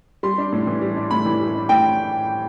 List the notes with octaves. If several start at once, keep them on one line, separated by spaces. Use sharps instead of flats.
G3 C6
D4
A2
E3
G3
D4
A2 B5
E3
G3
D4
A2 G5